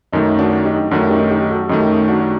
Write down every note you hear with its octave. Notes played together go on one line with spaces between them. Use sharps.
F#2 D#3 A3 D#4
D4 F#4
D#4 G4
F#2 D#3 A3 D4 F#4
D#4 G4
D#4 G4
F#4 A4
F#2 D#3 A3 D#4 G4
D4 F#4